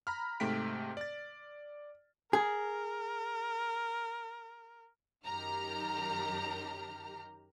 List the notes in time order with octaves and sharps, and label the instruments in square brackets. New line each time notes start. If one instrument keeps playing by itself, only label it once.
[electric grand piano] A#5 B5 F6
G#2 C3 A3 G5 B6 D7
D5 A6
[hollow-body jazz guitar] G#4 [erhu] A#4
[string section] F#2 D#3 G4 A#5 F6